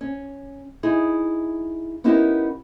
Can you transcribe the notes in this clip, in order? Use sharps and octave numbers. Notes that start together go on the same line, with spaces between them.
C#4
D#4 E4 G#4
B3 C#4 D#4 E4 G4 A#4